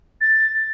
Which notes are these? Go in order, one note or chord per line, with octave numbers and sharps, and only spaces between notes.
A6